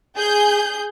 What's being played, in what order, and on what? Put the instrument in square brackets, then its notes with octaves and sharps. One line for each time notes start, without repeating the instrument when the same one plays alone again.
[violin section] G#4 G6